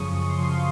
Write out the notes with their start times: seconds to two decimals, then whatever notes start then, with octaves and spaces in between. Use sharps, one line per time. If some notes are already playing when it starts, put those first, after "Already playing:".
Already playing: F#2 C#3 F3 C#6 D#6
0.11 F#2
0.29 C6
0.38 C#3 F3
0.47 F5